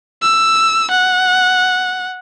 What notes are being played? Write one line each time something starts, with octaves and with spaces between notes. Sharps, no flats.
E6
F#5